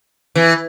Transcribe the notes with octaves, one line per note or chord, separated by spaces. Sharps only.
E3